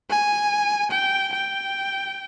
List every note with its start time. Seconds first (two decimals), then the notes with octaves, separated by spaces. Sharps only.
0.10 G#5
0.91 G5
1.33 G5